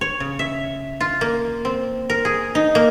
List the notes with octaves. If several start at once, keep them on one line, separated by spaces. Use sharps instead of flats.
C#5
C#3
E5
F4
A#3
C4
A#4
G#4
D#4
A#3